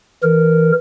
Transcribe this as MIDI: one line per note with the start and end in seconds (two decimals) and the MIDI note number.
0.23 0.72 52
0.23 0.72 70